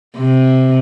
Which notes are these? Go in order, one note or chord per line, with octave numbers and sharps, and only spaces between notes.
C3